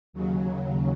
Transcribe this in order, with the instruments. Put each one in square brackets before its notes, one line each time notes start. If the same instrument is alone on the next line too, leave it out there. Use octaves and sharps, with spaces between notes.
[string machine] D#2 C#3 F#3